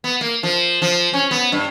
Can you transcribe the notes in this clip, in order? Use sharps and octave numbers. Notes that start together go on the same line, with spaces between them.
B3
A#3
F3
F3
C#4
B3
G2